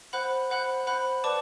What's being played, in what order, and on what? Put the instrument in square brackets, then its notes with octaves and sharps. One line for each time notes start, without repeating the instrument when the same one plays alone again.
[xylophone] C5 F#5 B5 F#6
C5 F#5 B5 F#6
C5 F#5 B5 F#6
B4 D5 A5 D6